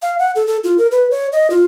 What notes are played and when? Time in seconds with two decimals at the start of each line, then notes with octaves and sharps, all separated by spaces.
0.02 F5
0.19 F#5
0.36 A4
0.47 A4
0.64 F4
0.78 A#4
0.92 B4
1.11 C#5
1.32 D#5
1.50 F4